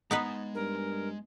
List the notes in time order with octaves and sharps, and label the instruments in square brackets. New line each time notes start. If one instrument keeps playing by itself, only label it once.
[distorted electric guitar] G#3 A#5 [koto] B3 D#4 B4
[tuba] G2 [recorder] A#4